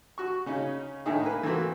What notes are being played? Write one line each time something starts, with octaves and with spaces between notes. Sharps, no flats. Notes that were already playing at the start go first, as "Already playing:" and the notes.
F#4 C#6
C#3 C#4 D#4
A2 D3 D#3 D#4 E4 G#4
A#3 B4
E3 A3 A#3 C4 F#4